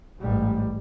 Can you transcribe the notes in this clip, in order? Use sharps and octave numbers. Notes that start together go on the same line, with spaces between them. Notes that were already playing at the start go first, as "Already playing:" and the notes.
A1 G#2 G3